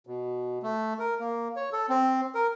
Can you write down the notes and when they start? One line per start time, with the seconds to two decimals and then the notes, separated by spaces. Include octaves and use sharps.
0.07 B2
0.63 A3
0.99 A#4
1.20 A#3
1.56 C#5
1.72 A4
1.89 C4
2.35 A#4